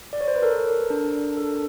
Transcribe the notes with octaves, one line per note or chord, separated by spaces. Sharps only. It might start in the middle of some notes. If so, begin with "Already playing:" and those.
D5
C#5
C5
B4
A4 A#4
D4
A4